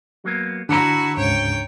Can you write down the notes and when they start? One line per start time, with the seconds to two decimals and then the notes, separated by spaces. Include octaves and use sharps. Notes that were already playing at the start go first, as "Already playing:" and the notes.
0.25 F#3 A#3 B3
0.69 D3 D4 E4 F#4 F#5 A#5
1.17 D2 G#2 C#3 C#5 G5